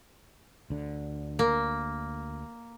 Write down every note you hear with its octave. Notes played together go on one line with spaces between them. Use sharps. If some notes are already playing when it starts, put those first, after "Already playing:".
D2 D3
A#3